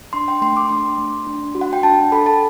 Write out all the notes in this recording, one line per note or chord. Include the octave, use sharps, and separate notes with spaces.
D4 C6
G5
A3 C6
D6
D4 C6
A3
D4
F#4
F#5
G5
D4 A5
A4 B5
A5